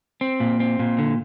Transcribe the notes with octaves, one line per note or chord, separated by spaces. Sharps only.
C4
A#2
C4
A#2
D3